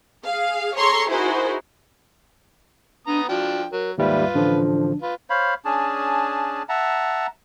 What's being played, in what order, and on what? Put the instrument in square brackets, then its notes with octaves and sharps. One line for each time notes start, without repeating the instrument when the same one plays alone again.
[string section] G#4 F5
G#4 A4 C#5 A#5 C6 C#6
D#4 E4 F#4 G#4 A#4 C5
[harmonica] B3 A#5 D#6 [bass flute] D4
[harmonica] F3 D4 G5 [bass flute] F#4
[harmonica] F#3 [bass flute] A#4
[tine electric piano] D#2 G#2 G3 [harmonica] F4 B4 [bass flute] E5
[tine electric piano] A1 D3 F3 [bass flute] D4
[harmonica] F4 B4
[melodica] C5 C#5 F5 B5
C#4 D4 G#4 A5
E5 F#5 A5 A#5